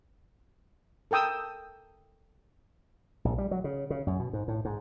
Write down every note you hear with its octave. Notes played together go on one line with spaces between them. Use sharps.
A4 A#4 G5 D#6 E6
A#1
G3
F#3
C#3
C#3
F#2
B2
G#2
A2
G#2